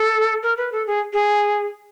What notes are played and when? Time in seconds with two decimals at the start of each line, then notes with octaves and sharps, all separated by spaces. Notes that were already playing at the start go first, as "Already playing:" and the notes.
Already playing: A4
0.43 A#4
0.57 B4
0.72 A4
0.87 G#4
1.13 G#4